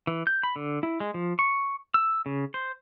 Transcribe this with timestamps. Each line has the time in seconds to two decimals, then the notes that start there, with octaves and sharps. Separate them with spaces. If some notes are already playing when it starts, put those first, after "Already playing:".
0.07 E3
0.27 G6
0.43 B5
0.56 D3
0.83 E4
1.00 G#3
1.14 F3
1.39 C#6
1.94 E6
2.26 C#3
2.54 C5